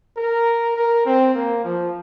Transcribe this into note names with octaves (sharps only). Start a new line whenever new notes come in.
A#4
A#4
C4
A#3
F3